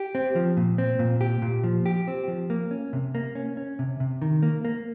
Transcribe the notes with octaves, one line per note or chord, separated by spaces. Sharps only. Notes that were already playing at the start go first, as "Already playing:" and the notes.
Already playing: G4
C4
F3
A#2
C4
A#2
G4
A#2
F3
G4
C4
F3
A#3
C#4
C3
A#3
C#4
C#4
C3
C3
D#3
A#3
A#3